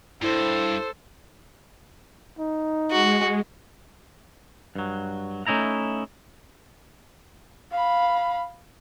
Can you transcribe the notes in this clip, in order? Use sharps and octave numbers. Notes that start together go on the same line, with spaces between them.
G2 E4 A4 C5
D#4
G#3 F#4
G2 F#3
A3 C#4 D#4 E4 A#5
F5 B5